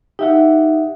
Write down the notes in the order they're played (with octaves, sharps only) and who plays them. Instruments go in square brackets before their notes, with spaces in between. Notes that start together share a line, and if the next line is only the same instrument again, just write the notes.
[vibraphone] D#4 [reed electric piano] G4 E5 F#5